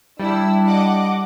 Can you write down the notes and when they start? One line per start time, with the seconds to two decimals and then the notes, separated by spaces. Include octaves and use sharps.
0.20 G3 D4 E4 E6
0.67 D#5 F#5 D6